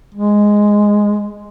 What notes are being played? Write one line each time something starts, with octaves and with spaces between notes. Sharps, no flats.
G#3